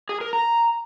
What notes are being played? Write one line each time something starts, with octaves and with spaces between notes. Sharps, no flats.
G#4
A#4
A#5